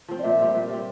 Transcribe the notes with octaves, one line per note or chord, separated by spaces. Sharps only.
F3 C4
D5
A#2 E5
G3 C4
A#2
G3 C4